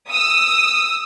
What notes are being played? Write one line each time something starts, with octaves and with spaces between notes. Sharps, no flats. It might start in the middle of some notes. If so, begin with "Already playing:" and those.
D#6 E6